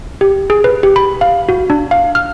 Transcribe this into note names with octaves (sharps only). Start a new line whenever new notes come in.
G4
G#4
B4
G4
B5
F5
F#4
D4
F5
F6